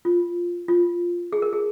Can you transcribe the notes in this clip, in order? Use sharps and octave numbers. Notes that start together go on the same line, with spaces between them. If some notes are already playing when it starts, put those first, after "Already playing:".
F4
F4
G#4
A#4
G#4